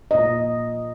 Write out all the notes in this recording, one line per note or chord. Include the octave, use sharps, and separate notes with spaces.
A#2 D#5